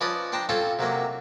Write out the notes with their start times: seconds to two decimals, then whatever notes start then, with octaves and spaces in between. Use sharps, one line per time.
0.01 F3 C#4 B4 D5 D#5 D#6
0.32 D4 C5 G5 A5 A#5
0.49 C4 C#4 F4 A4 C5 C#5
0.79 C3 F#3 A#3 C#4